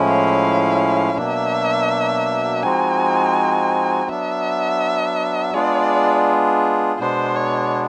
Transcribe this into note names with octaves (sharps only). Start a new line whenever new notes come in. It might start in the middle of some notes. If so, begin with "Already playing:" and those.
Already playing: A2 F3 G#3 C#4 E4
F5
B2 F#3 A#3 D4 E5
F3 G#3 C4 D#4 F#4 G#5
F#3 B3 D4 E5
G#3 B3 D4 F4 G#4 D5
B2 G#3 B3 D4 C5
C#5